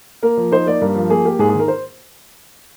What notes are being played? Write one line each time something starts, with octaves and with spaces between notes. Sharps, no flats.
A#3 A#4
F3
D#4 C5
A#3 D5
G2 A#4
F3
A#3 G#4
A#3 G4
G#2 G#4
G#4
D#3
A#4
C5